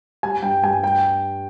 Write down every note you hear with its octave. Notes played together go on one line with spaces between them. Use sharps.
G3 G#5
G2 G5
G2 G#5
G3 G5